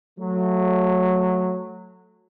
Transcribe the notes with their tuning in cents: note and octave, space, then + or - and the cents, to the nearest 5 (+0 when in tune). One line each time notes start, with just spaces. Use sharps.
F#3 -15 A3 +0